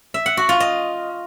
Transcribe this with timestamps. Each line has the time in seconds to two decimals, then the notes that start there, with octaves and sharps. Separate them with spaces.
0.14 E5
0.26 F#5
0.37 F#4
0.49 F4
0.60 D#5